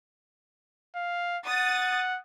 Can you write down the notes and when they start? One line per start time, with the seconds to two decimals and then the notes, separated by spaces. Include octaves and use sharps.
0.95 F5
1.45 F#5 D#6 A6